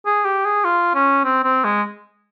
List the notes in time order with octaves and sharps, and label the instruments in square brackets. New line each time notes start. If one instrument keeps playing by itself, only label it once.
[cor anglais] G#4
G4
G#4
F4
C#4
C4
C4
G#3